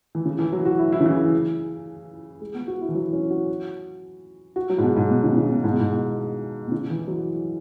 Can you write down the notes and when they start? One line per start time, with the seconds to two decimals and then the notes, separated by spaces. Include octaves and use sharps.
0.15 E3
0.26 C#3
0.39 E3
0.52 F#3
0.65 F#4
0.79 E4
0.92 E4
1.00 C#3
1.06 E3
2.41 G#3
2.55 B3
2.68 F#4
2.81 E4
2.89 E3
2.95 F#3
3.13 C#4
3.30 F#4
4.56 F#4
4.69 F#3
4.78 G#2
4.83 B2
4.96 G#2
5.10 B2
5.23 C#3
5.31 B2
5.38 C#3
5.50 B2
5.64 G#2
5.72 B2
5.80 G#2
5.92 B2
6.67 B2
6.71 C#3
6.90 E3
7.07 F#3